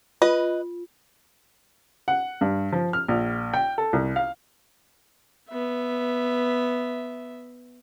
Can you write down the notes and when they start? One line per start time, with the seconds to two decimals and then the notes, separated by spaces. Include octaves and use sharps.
0.22 F4 B4 D#5
2.08 F#5
2.41 G2
2.73 F3
2.93 F6
3.08 A#1
3.54 G5
3.78 A4
3.93 C2
4.16 F5
5.50 B3 E5